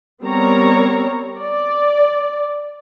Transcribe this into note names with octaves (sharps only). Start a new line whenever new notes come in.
G3 B3 C4 A#4 C#5 A#5
D5